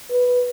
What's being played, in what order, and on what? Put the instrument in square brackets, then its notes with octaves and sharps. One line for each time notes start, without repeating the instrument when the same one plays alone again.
[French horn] B4